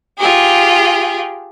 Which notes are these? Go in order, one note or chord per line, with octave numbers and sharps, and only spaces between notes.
F4 G4 G#4